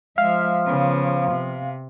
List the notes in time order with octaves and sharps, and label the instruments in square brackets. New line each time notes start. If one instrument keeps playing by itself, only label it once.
[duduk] F3 [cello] G#3 E5 [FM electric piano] F5
[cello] C#3 B3
C3